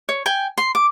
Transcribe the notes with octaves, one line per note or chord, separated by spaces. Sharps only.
C#5
G5 G#5
C6
D6